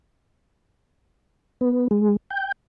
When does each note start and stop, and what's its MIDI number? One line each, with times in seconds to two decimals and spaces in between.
1.61 1.88 59
1.91 2.16 56
2.30 2.52 79